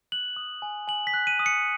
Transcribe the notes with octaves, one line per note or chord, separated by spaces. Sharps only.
F#6 F#7
D#6
G#5
G#5 F#7
B6
F#6
D#7
D#6
C#7